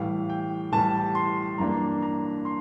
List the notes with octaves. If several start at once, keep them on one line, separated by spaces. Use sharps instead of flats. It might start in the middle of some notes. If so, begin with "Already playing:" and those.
Already playing: A2 E3 G3 F5
G5
A2 E3 G3 A5
C6
G2 E3 A#3 D4 A#5
A#5
C6